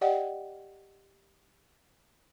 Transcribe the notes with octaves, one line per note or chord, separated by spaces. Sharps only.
G4 D5 D#5 F#5 G5